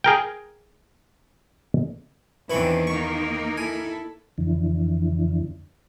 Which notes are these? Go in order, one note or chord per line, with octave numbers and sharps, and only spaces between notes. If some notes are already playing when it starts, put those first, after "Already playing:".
G#4 A#4 G5
E2 D#3 E3 C4 D4 B5 C#6
A#3 D#4 A#4 C#6
E4 A4 G#5
F2 D3 E3